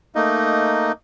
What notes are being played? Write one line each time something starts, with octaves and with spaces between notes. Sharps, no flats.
A3 A#3 D#4 D#5